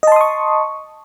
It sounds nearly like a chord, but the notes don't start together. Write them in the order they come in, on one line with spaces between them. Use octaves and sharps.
D#5 A5 C6 D#6 C#6